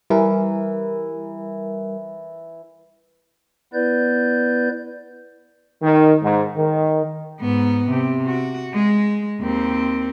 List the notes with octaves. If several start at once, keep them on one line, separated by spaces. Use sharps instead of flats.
E3 G3 E4 A#4
B3 E4 B4 D5 G6
D#3
G#2
D#3
G#2 B3
C3
F#4
G#3
D#2 C4